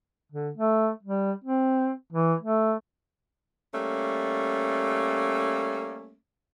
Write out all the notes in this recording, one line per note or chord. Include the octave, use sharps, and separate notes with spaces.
D3
A3
G3
C4
E3
A3
G3 A3 A#3 C#4